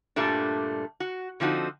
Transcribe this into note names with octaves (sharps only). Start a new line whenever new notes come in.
G2 A#2 G3 A3 D4
F#4
D3 F3 C4 D#4 F#4